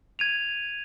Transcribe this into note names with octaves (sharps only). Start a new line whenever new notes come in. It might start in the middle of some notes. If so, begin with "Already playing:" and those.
G#6 D#7 F7